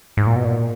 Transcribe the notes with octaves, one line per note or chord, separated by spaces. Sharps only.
G#2
A#2
B2
A#2